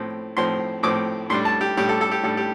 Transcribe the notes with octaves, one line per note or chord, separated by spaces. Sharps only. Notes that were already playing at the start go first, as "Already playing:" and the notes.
Already playing: A2 F3 C4
A2 F3 C4 C6
A2 F3 C4 D6
A2 G3 D4 C6
A5
G4
A2 G3 D4 G4
A4
A4
G4
A2 G3 D4 A4
G4